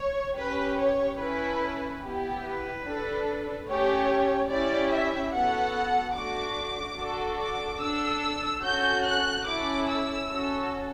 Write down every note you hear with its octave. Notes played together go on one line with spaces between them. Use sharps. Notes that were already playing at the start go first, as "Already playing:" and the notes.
Already playing: C#5
C#4 G4 B4
C#5
C#4 E4 A4 B4
B3 E4 G4
B4
D4 A4
A3 C#4 G4 C#5
C#4 E4 G4 D5
E5
B3 F#4 A4 F#5
A3 D4 F#4 D6
D4 F#4 A4
D6
D4 A4 E6
C#4 F#4 A4 G6
F#6
C#4 E4 A4 D6
E6
C#4 F#4 A4